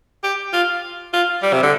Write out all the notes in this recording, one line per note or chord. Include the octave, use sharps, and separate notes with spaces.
G4
F4
F4
G3
C3
D3